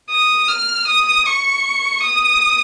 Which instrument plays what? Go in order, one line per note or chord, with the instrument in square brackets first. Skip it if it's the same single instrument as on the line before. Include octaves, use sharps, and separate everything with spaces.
[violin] D#6
F6
D#6
C#6
D#6